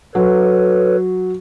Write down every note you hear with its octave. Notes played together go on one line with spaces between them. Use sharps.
F#3 A4 B4 C#5